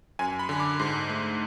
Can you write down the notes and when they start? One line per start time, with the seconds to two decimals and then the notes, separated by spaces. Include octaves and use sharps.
0.19 F#2 G#5
0.39 B5
0.49 D3
0.60 D6
0.80 G#2
1.09 A3